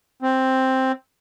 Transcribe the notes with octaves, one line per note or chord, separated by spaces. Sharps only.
C4